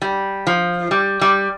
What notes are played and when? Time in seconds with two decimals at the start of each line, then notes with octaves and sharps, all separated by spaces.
0.02 G3
0.47 F3
0.91 G3
1.21 G3